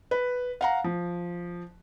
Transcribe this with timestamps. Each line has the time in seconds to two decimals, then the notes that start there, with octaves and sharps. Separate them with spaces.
0.11 B4
0.61 F5 F#5 A#5
0.84 F3